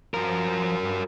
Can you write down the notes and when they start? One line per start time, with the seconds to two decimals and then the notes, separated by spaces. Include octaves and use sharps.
0.14 F3 F#4 A#4
0.83 G2